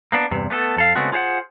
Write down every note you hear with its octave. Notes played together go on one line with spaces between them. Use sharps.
A#3 B3 D4
E2 G2 C3
A3 B3 G4 A4
F2 A4 F5
C#3 G#3 A3 B3 C4 F#4
F4 G#4 C5 F5 F#5